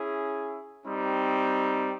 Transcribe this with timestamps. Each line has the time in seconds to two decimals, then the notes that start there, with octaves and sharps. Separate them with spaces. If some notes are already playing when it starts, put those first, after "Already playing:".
Already playing: C#4 E4 G#4
0.85 G3 C4 D#4